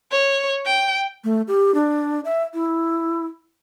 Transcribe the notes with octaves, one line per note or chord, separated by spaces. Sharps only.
C#5
G5
A3
G4
D4
E5
E4